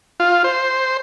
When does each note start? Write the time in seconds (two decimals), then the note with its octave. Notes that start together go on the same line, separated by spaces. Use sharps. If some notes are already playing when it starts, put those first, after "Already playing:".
0.20 F4
0.44 C5